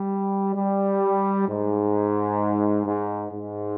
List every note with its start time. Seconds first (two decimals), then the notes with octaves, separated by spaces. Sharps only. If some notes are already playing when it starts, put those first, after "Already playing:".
Already playing: G3
0.55 G3
1.48 G#2
2.86 G#2
3.31 G#2